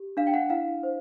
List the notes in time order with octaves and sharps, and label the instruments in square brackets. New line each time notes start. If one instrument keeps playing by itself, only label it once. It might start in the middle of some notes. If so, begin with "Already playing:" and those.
Already playing: [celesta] G4
D4 F5
G5
F#5
E4 F5
C5